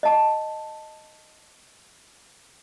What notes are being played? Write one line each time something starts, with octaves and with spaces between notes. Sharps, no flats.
D#5 A5